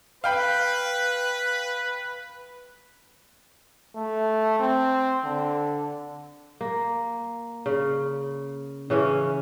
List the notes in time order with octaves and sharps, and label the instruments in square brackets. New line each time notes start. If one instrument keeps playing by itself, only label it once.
[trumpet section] B4 [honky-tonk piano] F5 G5 B5
[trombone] A3
C4
D3
[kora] A#3
C#3
C#3 E3 C#4